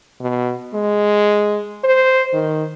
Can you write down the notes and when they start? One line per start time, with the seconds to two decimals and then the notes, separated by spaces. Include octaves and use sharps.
0.21 B2
0.74 G#3
1.84 C5
2.34 D#3